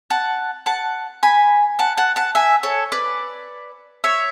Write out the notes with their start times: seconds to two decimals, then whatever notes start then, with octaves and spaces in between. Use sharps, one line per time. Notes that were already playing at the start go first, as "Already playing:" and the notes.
0.10 F#5 A5
0.66 F#5 A5
1.23 G#5 B5
1.79 F#5 A5
1.97 F#5 A5
2.16 F#5 A5
2.35 E5 G#5
2.63 A4 C#5
2.92 B4 D5
4.04 C#5 E5